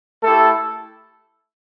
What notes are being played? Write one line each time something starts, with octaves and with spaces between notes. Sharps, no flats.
A3 E4 G4 A4